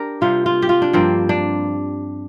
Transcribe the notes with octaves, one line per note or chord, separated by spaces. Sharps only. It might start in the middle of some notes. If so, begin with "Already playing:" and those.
Already playing: D4 G4 A#4
C3 G3 A#3 F4
F4
G4
F4
D4
G2 F3 A#3 C4
D4